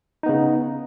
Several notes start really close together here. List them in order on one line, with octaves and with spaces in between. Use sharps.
D#4 B3 C#3